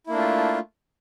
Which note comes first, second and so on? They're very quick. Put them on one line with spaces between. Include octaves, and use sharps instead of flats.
E4 A#3 D4 A3 F4